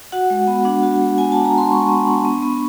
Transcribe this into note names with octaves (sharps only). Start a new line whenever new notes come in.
F#4 F#5
G#3
B3
D4
F#4
G#3
B3 G#5
D4 A5
A#5
F#4 C6
G#3 C#6
B3
D4
B3
B3